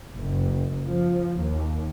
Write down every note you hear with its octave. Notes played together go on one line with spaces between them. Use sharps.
F#1
F3
D#2